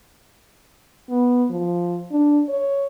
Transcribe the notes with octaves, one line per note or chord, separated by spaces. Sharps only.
B3
F3
D4
C#5